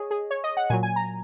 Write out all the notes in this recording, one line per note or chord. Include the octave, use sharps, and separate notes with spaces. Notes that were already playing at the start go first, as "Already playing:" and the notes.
Already playing: G#4 C#5 D#5
G#4
C#5
D#5
F#5
A#2 F#3 G#5
G#5
A#5